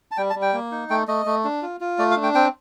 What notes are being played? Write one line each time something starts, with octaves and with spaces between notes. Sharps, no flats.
A5
G3 G5
A5
G3
G5
A#3
D#4
A3 G5
A3 D#5
A3
D4
F4
F4
A3 D5
F5
D4
G5
C4 G5